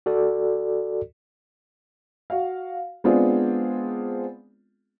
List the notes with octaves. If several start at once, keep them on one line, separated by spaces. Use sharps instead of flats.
F#4 A4 D5
F#4 F5
G#3 B3 C4 D4 F4 G#4